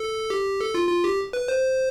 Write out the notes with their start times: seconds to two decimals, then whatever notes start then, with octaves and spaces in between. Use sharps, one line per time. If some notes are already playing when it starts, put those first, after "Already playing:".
Already playing: A4
0.30 G4
0.60 A4
0.74 F4
0.89 F4
1.04 G4
1.33 B4
1.48 C5